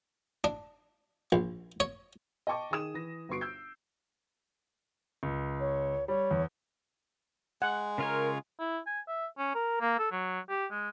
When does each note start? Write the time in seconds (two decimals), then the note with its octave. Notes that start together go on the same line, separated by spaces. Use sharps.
0.44 D4
1.32 A#1
1.80 C#5
2.47 D#5 G5 A5 C#6 D6
2.71 D#3 G#4 D#6 E7
2.94 E3 A#6
3.29 G1 B3 F#4 C#6 C7 D7
3.41 E6 G6
5.23 C#2
5.60 C#5
6.08 G3 C#5
6.31 E2
7.62 G#3 F#5
7.98 C#3 F4 A#4 C#5
8.59 E4
8.87 G#5
9.08 E5
9.39 C#4
9.55 A#4
9.81 A#3
9.99 A4
10.12 F#3
10.49 G4
10.71 G#3